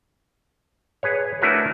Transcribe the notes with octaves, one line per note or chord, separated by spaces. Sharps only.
G#4 B4 C#5
A3 D4 E4 F#4 A#4 B4